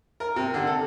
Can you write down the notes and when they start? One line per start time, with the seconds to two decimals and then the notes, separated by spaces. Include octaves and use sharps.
0.20 A#4
0.36 C3
0.54 D3
0.67 A4